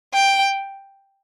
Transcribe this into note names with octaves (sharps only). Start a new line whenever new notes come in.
G5